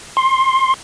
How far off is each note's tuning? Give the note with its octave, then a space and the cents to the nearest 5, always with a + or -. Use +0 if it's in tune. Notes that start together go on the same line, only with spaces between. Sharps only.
C6 +20